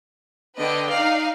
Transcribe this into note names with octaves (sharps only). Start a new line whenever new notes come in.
D3 B4 D#5 G5
D#4 D5 F5